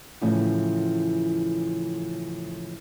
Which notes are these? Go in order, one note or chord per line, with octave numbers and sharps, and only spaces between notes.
A2 C#3 E3 F3